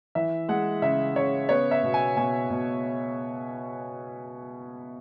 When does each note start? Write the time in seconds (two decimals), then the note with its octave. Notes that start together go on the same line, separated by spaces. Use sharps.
0.15 E3 E5
0.49 G#3 F#5
0.82 C#3 E5
1.16 C#3 C#5
1.49 B3 C#5
1.71 E5
1.83 B2
1.94 G#5
2.17 B2 G#5
2.50 B2